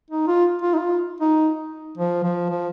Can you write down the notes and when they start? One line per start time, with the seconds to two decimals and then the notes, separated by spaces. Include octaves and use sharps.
0.10 D#4
0.27 F4
0.62 F4
0.74 D#4
0.78 F4
1.21 D#4
1.97 F3
2.23 F3
2.50 F3